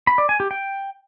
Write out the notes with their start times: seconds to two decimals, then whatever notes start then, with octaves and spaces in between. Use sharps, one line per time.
0.07 B5
0.18 D5
0.29 G#5
0.40 G4
0.51 G5